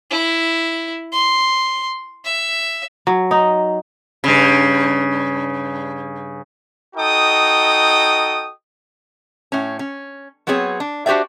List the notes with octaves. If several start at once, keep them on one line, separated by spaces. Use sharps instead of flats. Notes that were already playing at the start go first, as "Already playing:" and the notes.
E4
C6
E5
F#3
D#4
G2 C#3
D#4 F#4 A4 D#5 G5 D#6
A2 C#4
C#4
F#3 B3 C4 G#4 C#5
D4
D4 F#4 G4 C5 D5 E5